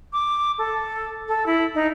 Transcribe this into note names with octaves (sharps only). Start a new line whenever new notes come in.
D6
A4
A4
E4
D#4